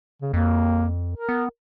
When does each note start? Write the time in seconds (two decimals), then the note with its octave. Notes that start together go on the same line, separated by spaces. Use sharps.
0.22 C#3
0.33 F2 A#3
1.14 A#4
1.29 B3